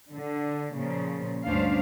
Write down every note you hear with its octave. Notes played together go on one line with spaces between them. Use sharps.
D3
A#2 C#3 F3
D2 G2 C#4 D4 C5 F5